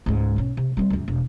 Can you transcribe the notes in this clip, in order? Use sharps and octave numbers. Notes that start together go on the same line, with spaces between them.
C#2 G#2
B1 C#4
C3
G3 C4
C#2 F#2
E1